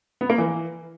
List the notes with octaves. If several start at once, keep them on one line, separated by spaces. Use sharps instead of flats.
B3
A#3
E3